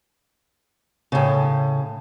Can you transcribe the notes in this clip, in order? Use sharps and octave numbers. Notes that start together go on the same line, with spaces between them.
A2 C#3